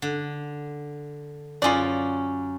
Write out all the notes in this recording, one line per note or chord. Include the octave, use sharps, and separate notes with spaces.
D3
F#2 C#4 F4 G#4 D5